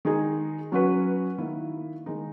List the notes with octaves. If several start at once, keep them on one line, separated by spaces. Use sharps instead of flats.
D#3 G#3 D#4 G#4
F#3 C#4 F#4 B4
D#3 A#3 E4
D#3 G#3 D#4